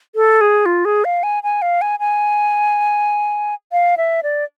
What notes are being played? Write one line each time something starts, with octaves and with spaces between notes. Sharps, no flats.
A4
G#4
F4
G#4
F5
G#5
G#5
F5
G#5
G#5
F5
E5
D5